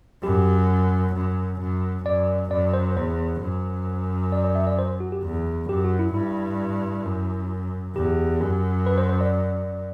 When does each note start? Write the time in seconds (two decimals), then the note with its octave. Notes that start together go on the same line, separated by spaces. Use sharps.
0.23 F#2 G4
1.15 F#2
1.60 F#2
2.05 F#2 D5
2.51 F#2 D5
2.74 C5
2.96 E2 C5
3.42 F#2
4.32 D5
4.44 D5
4.55 E5
4.67 D5
4.79 C5
5.00 F#4
5.12 G4
5.24 E2
5.69 F#2 G4
5.84 F#4
5.99 E4
6.14 G2 E4
7.05 F#2
7.96 E2 G4
8.41 F#2
8.87 B4
8.98 C5
9.09 C5
9.21 D5